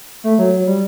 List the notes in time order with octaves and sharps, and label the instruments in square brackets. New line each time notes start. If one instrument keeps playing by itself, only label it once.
[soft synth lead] A3
F#3
F#3
G3